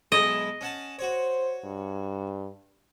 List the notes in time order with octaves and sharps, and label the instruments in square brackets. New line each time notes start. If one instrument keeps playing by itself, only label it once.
[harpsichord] B1 G#3 E4 [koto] D#5
[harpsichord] C#4 F#5 A5
[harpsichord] F#4 C#5 [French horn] C5
[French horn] G2